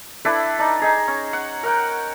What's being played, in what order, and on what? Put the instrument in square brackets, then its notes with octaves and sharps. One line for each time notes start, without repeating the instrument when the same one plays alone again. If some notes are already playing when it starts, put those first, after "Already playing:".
[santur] D4 E4 A4 B4
D4 D#4
D#4 G#4 A#5
C#4
F#5
A#4 F#5 G5